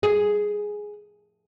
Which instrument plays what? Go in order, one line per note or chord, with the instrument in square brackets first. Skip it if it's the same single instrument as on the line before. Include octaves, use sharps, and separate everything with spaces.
[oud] G#4